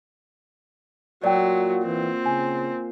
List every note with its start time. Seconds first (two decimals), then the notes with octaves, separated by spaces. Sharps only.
1.24 A#2 F#3 F#4 D5 G5
1.85 E3 C4
2.26 C#3 G#5